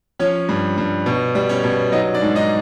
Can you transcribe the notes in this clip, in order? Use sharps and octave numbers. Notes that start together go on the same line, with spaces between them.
F3 C#4 C#5
G2
G2
B2
G3
C#4 C#5
B2
F#3 D#4 D#5
D4 D5
G#2
D#4 D#5